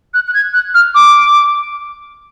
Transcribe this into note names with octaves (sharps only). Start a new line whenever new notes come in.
F#6
F#6
G#6
F#6
F6
D6